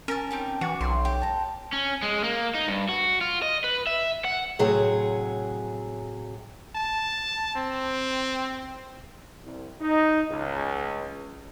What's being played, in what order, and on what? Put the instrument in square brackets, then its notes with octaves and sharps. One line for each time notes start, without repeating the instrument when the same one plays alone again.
[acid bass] C#4 [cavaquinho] A#4 A5
[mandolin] C4 D#4 G4
[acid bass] E3 [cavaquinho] F#4 [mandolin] D5
[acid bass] B1 [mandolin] C4 C6
[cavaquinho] G4
[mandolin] A5 A#5
[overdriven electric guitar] C#4
G#3
A#3
D#4
G2
F#4
F4
D#5
B4
E5
F#5
[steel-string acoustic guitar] A2 C3 F#3 G#4
[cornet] A5
C4
[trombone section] C2
D#4
C#2